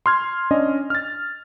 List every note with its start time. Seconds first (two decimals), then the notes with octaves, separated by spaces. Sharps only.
0.06 C6 F6 G#6
0.51 C#4 D4 D5 D#5
0.90 F6 A6